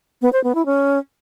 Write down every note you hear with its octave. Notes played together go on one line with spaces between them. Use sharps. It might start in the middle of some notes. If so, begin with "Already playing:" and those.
B3
C5
B3
E4
C#4